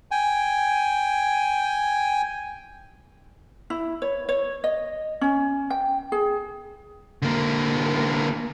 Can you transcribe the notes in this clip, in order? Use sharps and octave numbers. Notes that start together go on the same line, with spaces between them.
G5 G#5
E4
C#5
C#5
D#5
C#4
G5
G#4
D3 A#3